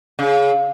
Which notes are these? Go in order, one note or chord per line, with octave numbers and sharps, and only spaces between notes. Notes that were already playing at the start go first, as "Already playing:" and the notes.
C#3